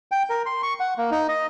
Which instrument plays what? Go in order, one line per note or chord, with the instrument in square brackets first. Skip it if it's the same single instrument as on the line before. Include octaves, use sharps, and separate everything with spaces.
[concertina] G5
A#4
C6
C#6
F#5
A#3
D#4
D#5